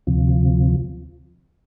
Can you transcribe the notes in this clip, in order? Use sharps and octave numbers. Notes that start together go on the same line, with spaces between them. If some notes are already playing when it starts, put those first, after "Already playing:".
D2 C3 F3